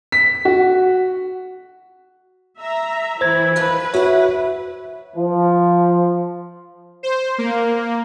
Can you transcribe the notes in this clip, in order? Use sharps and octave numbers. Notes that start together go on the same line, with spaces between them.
B6
F#4
E5 A#5
E3 E4 C5 G#6
G2 D#3 F3 B4
E4 F#4 C#5 F#5
F3
C5
A#3